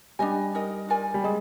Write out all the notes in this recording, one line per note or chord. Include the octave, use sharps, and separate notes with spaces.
G3 D4 G#4 D#5 G#5
D#4 A#4 D#5
F4 A#4 D5 G#5
G3
G#3 G#4